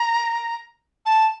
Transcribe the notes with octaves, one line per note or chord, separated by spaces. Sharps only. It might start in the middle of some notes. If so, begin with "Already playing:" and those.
Already playing: A#5
A5